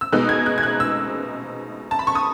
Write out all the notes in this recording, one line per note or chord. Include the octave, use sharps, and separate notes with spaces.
E6
B2 G#3 B3 D#4 F#6
G#6
F#6
G#6
F#6
E6
A5
B5
C#6
D#6